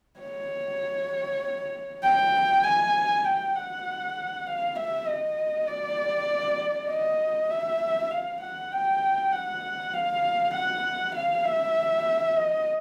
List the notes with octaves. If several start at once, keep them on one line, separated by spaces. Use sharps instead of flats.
C#5
G5
G#5
G5
F#5
F5
E5
D#5
D5
D#5
E5
F5
F#5
G5
F#5
F5
F#5
F5
E5
D#5